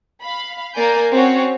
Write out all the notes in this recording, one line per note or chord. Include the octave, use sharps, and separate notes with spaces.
F5 B5
A#3 A#4 D5 G#5 G6
C4 C#4 F#4 C#5